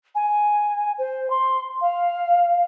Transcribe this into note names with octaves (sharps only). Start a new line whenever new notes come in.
G#5
C5
C6
F5